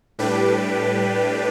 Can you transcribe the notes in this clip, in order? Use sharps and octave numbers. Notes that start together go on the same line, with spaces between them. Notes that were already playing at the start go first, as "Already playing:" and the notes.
A2 G3 D4 G4 B4